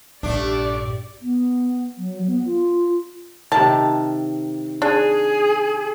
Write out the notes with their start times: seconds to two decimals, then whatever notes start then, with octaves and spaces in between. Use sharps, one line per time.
0.23 A#1 G2 A3 D4 G4 D5
1.22 B3
1.98 F#3
2.27 B3
2.45 F4
3.52 C3 D#3 A#4 A5
4.82 D4 G#4